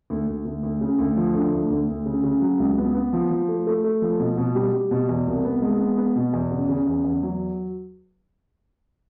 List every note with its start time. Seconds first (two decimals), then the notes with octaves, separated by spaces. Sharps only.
0.10 D2
0.27 D2
0.45 D2
0.63 D2
0.81 C#3
0.99 D2
1.17 F3
1.34 D3
1.52 D2
1.70 D2
1.88 D2
2.06 C#3
2.24 C#3
2.42 F#3
2.59 C#2
2.78 B3
2.95 B3
3.13 F3
3.31 F3
3.48 A3
3.67 A3
3.84 A3
4.02 F3
4.20 B2
4.37 B2
4.55 G3
4.73 G3
4.91 B2
5.09 E2
5.27 C2
5.45 B3
5.62 G#3
5.80 B3
5.98 B3
6.16 B2
6.33 E2
6.51 C#3
6.69 C#3
6.87 E2
7.04 E2
7.23 F#3